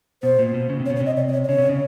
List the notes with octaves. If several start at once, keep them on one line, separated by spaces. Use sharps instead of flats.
B2 C5
A#2
B2
C#3
C3
C#5
B2
C#5
C3
D#5
D5
D5
C#5
D5
C#3 C#5
C3
C#3